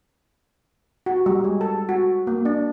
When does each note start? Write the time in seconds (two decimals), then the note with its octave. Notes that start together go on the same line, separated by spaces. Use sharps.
1.06 F#4
1.26 G3
1.44 G#3
1.61 A4
1.89 F#4
2.27 A#3
2.45 D4